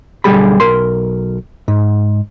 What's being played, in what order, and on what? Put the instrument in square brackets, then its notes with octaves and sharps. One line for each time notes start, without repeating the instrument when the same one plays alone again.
[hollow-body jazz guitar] B1 D3 G3 G4 G#4 B5
B1 A#4 C6
G#2